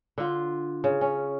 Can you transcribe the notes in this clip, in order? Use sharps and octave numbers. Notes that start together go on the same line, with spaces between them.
D3 F4
C#3
C#4